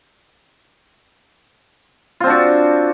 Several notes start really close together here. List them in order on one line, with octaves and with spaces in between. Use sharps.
F4 C4 D4 F#4